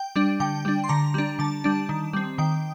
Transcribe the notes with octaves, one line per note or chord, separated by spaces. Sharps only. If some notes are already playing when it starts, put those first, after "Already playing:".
Already playing: G5
G3 D4
D3 G5
G3 D4
C6
D3 A#5
G3 D4
D3 A5
G3 D4
D#3
G3 C4
D#3 G5